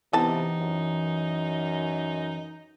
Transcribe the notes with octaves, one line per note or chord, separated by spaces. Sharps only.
C3 E3 B3 D#4 E4 A5
F#2